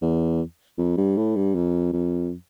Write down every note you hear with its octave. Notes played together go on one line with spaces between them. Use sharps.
E2
F2
G2
A2
G2
F2
F2